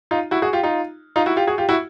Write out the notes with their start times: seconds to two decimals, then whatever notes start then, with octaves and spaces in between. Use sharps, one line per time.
0.11 D#4 F4
0.31 E4 F#4
0.42 F#4 G#4
0.53 F4 G4
0.63 D#4 F4
1.16 D#4 F4
1.26 E4 F#4
1.36 F4 G4
1.47 F#4 G#4
1.58 F4 G4
1.69 E4 F#4